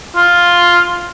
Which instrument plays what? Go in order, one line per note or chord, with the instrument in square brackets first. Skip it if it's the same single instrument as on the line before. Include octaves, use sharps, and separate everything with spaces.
[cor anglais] F4